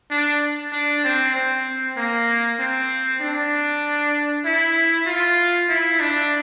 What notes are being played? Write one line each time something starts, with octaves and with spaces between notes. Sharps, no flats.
D4
D4
C4
C4
A#3
C4
D4
E4
F4
E4
D4